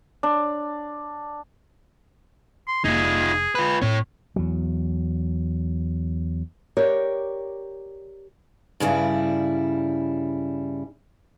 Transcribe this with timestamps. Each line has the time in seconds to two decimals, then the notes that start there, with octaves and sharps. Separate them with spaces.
0.23 D4
2.68 C6
2.85 F1 A#3 D#4 F4 G#4
3.55 F4 B4
3.82 A2 C4 E4 C#5
4.36 E2 F#3
6.77 G4 A#4 C#5 D5
8.80 G2 C#3 G3 E4